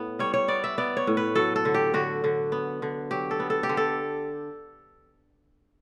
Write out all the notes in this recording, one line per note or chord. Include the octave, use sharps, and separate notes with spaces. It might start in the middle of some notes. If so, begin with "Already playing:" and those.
Already playing: A2 B3
G3 C#5
C#5
B3 D5
E5
B3 D5
C#5
A2
B4
F#3 A4
A4
D3
G4
D3 F#4
D3
B3
D3
F#3 G4
A4
B3
A4
G4
D3
A4